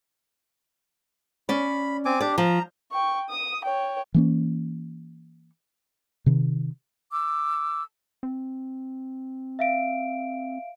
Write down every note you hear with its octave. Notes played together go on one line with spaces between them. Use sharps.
C#4 D5 B5
C4 G#5 D6
D4 G4 D5
F3 A#5
G5 C#6
D#6
C#5 G5
E3 A#3 C#4
C3 D#3
D6 E6
C4
E5 F5 D7